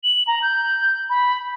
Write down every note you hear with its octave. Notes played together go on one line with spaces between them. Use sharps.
F#7
A#5
G6
B5